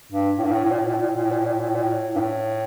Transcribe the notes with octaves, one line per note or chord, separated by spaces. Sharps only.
G2
A2
G2
A2
A2
A#2
A2
A#2
A2
A#2
A2
A#2
A2
A#2
A2
A#2
A2
A#2
A2
A#2
A2
G2
A2